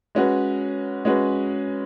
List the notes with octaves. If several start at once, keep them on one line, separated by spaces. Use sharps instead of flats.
G#3 C#4 F#4 B4
G#3 C#4 F#4 B4